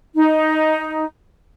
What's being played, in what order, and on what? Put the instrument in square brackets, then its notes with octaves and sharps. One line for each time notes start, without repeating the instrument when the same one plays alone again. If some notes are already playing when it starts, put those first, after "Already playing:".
[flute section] D#4